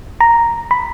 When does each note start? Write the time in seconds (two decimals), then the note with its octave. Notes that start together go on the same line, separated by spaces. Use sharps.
0.21 A#5
0.71 B5